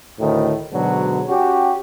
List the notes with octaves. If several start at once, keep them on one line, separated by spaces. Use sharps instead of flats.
D2 A2 D#3
G#2 B2 D3 F#3
C#4 F#4 G4